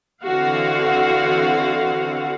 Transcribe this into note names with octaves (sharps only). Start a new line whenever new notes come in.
D3 E3 C4 F#4 F5 F#5